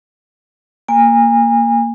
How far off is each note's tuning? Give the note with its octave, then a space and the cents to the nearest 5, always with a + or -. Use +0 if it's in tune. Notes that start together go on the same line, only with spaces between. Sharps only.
A#3 -5 G#5 -30